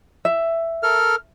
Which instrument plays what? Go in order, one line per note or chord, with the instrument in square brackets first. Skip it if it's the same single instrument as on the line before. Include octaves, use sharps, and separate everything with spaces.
[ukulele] E5
[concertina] A4 A#4 F6